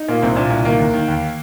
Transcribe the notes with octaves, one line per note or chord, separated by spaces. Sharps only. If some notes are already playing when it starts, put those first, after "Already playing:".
Already playing: D#4
A#2 A#3
C2 C4
A#2 D4
C2
D#3 A#3
D#2
D#3
D#2